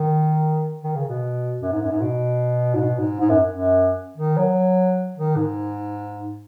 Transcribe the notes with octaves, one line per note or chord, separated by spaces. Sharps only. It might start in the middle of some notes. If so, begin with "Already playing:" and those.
Already playing: D#3
D#3
C#3
B2
F#2
G#2
F#2
G#2
B2
G#2
B2
G#2
G#2
F#2
F#2
D#3
F#3
D#3
G#2